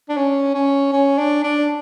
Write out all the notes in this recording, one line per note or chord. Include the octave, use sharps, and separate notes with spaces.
D4
C#4
C#4
C#4
D4
D4